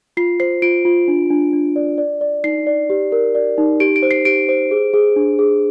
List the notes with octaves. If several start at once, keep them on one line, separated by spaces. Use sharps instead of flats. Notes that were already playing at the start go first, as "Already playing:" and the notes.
F4 C7
C5 C7
F4 D7
F4
D4
D4
D4
D5
D5
D5
D#4 C7
D5
G4
A#4
D5
D#4
G4 D7
D7
C5
C7
G4 D7
C5
G#4
G#4
D4
G#4